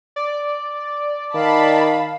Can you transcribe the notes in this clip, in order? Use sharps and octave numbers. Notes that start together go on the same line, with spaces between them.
D5
D#3 F5 A5 B5